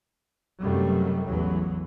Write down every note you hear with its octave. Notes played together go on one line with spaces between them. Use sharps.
F#2 C3 D#3 F#3 G3 A3
A1 E2 E3 F#3